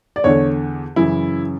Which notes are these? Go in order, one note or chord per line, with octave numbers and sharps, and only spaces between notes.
D5
E2 D3 C#5
F#2 C#3 E3 E4